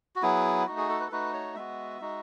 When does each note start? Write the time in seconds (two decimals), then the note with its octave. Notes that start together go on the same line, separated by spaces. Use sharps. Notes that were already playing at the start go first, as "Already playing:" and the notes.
0.16 F#4
0.22 F#3 B3 E4 G#4
0.67 A3 D#4 F#4
0.77 G#4
0.89 A4
1.00 B4
1.07 A4
1.12 A3 D#4 F#4 B4
1.34 C#5
1.55 G#3 B3 F#4 E5
2.01 G#3 D#4 F#4